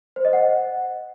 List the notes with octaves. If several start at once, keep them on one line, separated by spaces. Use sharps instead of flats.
C5
D#5
F#5